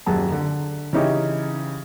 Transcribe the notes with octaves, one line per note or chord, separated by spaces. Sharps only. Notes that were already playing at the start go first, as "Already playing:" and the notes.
D#1 F#2 F#3 G#4 F#5 A5
D3
C#3 E3 C#4 D#4 E4 G4